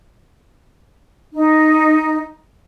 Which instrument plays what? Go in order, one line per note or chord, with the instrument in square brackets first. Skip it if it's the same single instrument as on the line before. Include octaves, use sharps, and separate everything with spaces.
[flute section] D#4